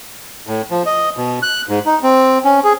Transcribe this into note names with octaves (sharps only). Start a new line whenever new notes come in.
A2
F3
D#5
B2
F#6
G#2
D#4
C4
C#4
G#4